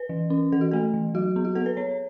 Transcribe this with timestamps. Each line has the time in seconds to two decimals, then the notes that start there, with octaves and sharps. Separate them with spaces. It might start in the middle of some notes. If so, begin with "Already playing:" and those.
Already playing: B4
0.09 E3
0.30 C#4
0.52 E3 A4
0.61 F#4
0.71 A3 A4
0.94 E3
1.14 F#3 F#4
1.36 B3
1.45 F#4
1.55 B3 A4
1.66 B4
1.77 B3 C#5